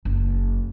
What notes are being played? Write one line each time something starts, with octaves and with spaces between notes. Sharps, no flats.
F#1